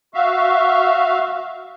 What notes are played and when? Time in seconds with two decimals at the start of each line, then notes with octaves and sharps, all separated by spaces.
0.14 F#4 E5 F5